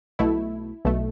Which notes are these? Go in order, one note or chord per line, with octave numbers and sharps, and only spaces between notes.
B1 B2 A3 E4
B1 B2 A3